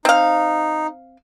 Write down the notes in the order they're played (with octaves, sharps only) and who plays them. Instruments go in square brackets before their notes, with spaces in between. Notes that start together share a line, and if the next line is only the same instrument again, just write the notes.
[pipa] C4 F5 [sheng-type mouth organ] D#4